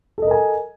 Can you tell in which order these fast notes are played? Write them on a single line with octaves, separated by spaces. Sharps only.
A4 D#5 A#4 G#5